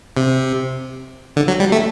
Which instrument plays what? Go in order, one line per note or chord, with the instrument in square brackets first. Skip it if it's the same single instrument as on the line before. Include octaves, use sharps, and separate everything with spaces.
[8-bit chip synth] C3
D3
F#3
G3
A3